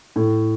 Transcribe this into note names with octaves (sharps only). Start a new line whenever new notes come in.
A2